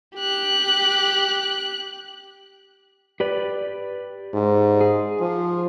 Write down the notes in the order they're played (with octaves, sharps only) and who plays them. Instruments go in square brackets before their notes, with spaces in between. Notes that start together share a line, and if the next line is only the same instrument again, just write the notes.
[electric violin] G4 F#6
[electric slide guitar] G4 B4 D5
[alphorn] G#2
[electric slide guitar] G#4
[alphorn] F3